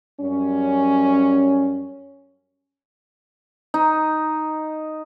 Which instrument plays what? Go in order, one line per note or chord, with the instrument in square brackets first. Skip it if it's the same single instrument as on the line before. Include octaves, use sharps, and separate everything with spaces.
[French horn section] F#2 G3 C#4
[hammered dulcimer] D#4